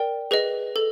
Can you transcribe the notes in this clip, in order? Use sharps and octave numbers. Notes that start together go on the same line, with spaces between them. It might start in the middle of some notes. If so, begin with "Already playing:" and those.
Already playing: A#4 D5 G5
G#4 B4 D#5
A4